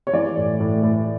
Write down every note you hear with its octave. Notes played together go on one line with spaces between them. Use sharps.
C#5
E3 D5
A2
A2
A2